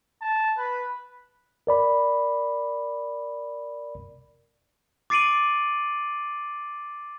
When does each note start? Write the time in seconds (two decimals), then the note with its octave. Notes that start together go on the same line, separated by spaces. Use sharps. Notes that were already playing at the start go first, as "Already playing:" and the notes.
0.21 A5
0.57 B4
1.67 A#4 D5 B5
5.10 D6 A6 C7 D7 D#7 F#7